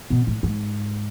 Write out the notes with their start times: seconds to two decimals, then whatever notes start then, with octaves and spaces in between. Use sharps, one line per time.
0.10 B2
0.27 A2
0.43 G#2